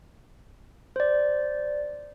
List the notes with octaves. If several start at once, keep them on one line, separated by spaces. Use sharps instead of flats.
C5 D5